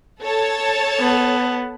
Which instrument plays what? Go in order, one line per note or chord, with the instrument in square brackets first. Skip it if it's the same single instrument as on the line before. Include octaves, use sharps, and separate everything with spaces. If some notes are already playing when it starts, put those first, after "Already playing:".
[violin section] A4 C#5 A5
[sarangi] B3